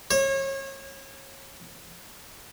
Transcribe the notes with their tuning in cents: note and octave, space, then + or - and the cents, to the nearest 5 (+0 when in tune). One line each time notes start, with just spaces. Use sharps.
C#5 -35